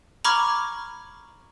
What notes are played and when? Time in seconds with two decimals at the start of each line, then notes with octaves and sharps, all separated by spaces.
0.25 A#5 B5 C#6 D6 F6 G#6